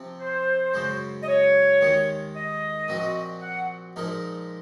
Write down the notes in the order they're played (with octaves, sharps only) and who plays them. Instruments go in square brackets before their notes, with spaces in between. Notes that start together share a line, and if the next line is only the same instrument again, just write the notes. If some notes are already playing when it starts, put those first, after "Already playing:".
Already playing: [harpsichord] C3 F3 C4
[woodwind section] C5
[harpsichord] F#2 C#3 G#3
[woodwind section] D#5
C#5
[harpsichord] D#2 D#3 G#3
[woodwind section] D#5
[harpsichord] A#2 F3 C4 F#4
[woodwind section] F#5
[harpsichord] A#2 F3 G#3 D#4 A#4